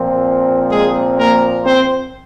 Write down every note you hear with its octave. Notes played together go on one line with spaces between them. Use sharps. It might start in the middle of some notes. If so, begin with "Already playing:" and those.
Already playing: A#2 F3 C4
G#3 G#4
A#3 A#4
C4 C5